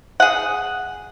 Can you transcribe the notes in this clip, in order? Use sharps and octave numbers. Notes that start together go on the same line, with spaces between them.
G#4 F#5